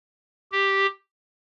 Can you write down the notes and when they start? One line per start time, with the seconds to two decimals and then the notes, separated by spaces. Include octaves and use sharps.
0.52 G4